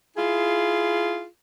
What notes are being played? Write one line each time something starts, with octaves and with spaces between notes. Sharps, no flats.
E4 F4 G#4